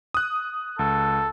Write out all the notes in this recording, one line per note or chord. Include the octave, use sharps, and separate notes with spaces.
D#6 F#6
C#2 A4